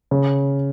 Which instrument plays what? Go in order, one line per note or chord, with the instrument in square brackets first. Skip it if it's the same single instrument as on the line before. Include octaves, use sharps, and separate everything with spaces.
[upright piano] C#3